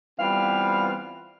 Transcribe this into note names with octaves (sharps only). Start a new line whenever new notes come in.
E3 G3 B3 C4 F4 F5